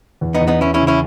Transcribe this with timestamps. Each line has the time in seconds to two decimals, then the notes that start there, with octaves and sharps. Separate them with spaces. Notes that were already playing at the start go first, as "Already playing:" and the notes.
0.21 E2
0.35 B3 D#4
0.41 E2
0.48 B3 D#4
0.61 E3 C#4 E4
0.74 C#4 E4
0.81 C#3
0.87 C#4 E4